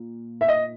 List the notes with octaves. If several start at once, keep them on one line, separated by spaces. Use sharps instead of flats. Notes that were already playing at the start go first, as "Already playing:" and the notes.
Already playing: A#2
E5
D#5